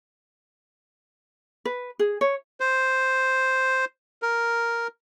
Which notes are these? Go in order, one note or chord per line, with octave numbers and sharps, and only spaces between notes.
B4
G#4
C#5
C5
A#4